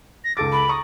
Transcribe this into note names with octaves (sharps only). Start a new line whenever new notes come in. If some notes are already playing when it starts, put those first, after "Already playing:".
A#6
C#2 A4 D6 A6
B5
A#5 C#6 D#6